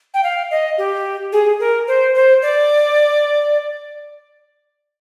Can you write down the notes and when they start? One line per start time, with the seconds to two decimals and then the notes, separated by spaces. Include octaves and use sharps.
0.14 G5
0.23 F5
0.51 D#5
0.78 G4
1.32 G#4
1.60 A#4
1.87 C5
2.15 C5
2.42 D5